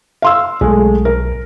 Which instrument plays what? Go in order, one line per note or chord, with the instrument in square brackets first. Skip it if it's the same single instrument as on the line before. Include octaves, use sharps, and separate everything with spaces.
[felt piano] F5 C6 E6
[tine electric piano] B1 [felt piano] G#3 A3
[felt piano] A#4